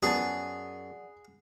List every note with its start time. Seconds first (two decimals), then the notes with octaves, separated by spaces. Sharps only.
0.03 F#2 B3 G#4 D5 F#5 A5